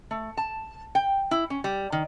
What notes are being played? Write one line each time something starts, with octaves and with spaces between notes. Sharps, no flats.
A3
A5
G5
E4
C#4
G3
D#3